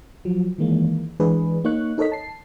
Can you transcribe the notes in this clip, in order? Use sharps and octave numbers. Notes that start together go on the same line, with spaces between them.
F3 F#3
D#3 E3 G#3 A#3
E3 G#3 D4 G#4 B4
A#3 D#4 C#5 C#6 F#6
D#4 A4 A#4 C#5 D#5 B6
A5 C7